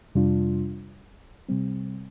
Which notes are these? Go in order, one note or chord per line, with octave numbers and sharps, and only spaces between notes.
F2 C3 G3 D4 F4
C3 G3 C4